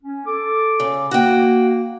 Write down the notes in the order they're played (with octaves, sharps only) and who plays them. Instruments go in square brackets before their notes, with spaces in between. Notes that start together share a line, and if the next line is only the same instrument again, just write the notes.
[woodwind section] C#4
A4 D6
[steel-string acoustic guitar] C#3
[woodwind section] A#3 [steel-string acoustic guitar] F#4 G5